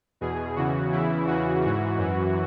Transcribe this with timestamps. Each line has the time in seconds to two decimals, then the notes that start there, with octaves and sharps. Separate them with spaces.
0.21 E2 B2 G#4
0.56 E2 C#3 E3 F#4
0.92 E2 C#3 E3 E4
1.27 E2 C#3 E3 F#4
1.62 G#2 E3 F#4
1.97 F#2 E3